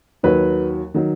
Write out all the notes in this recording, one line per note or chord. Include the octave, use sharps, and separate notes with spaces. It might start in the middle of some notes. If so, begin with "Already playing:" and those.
D#2 D#3 F#3 B4
D#3 F#3